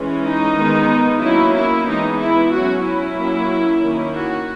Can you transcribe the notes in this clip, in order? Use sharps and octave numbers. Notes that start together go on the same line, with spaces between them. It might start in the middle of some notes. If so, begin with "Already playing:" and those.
Already playing: E3 G#3 C#4
D#4
D#3 G#3 B3
F#3 A#3 C#4 E4
E4
E3 G#3 B3 D#4
E4
F#3 C#4 F#4
E4
F#3 A#3 C#4
D#3 A#3 C#4
F#4